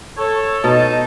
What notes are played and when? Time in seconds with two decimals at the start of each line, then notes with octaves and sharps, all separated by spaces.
0.18 A4 C#5
0.64 B2 D#4 A5